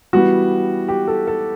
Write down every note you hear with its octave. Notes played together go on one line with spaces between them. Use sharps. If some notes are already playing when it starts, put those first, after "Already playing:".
E3 G3 B3 F#4
G4
A4
A4